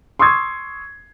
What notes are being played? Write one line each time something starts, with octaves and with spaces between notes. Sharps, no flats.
C6 C#6 D#6 E6 G#6